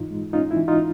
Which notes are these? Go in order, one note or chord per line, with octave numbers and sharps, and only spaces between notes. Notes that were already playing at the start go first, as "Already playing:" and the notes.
Already playing: G#2 E3 D#4 F4
G#3
C#4 D#4 F4
E4
E3
D#4 F4